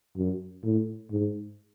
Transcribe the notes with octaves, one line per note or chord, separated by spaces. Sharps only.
F#2
A2
G#2